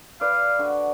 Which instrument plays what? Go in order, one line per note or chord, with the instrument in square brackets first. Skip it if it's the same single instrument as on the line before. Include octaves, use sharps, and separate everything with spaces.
[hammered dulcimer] B4 D5 [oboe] F5
[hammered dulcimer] D3 F#4